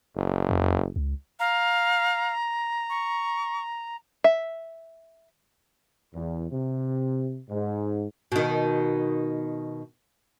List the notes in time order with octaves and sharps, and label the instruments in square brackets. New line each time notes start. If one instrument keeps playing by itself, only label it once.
[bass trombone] F#1
[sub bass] F2
C#2
[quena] F5 [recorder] A#5
[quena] C#6
[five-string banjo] E5
[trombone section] E2
C3
G#2
[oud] B2 D#3